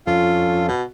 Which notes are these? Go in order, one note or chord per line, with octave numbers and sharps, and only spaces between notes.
F2 C#4 F4 A4
B2